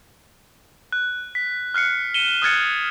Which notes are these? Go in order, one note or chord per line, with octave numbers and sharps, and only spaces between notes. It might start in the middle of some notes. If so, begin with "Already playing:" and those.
F#6
B6
F6 F#6 C7 C#7
C#7 D#7 E7 G7
D#6 F6 F#6 G#6 A6 C#7